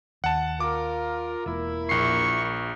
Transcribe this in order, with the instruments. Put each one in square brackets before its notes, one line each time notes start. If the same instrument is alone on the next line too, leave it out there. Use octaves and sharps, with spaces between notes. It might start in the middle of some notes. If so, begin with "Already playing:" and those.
[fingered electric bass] D#2 [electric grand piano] F#5 A5
[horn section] F4 A#4 [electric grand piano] D6
[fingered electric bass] E1 [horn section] A#3 E4
[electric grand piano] A#1 C7 [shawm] C#6